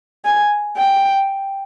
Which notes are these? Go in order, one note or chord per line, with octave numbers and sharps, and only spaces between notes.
G#5
G5